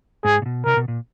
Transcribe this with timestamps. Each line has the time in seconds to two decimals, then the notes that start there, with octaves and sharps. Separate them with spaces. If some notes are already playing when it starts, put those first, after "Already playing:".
0.24 G#2 G#4
0.42 A#2
0.46 B2
0.65 C3 A#4
0.77 B2
0.88 A#2